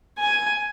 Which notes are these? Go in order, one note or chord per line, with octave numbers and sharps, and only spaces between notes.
G#5